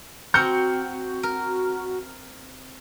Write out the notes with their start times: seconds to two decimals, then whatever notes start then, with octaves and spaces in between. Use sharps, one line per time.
0.34 C4 F#4 A#5 F6 G6 C#7
1.23 A#4